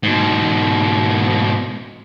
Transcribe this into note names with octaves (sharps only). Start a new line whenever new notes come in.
G#2 B2